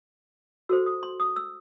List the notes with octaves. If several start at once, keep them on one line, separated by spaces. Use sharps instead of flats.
F#4 A4 C5 E6
D#6
C6
D#6
E6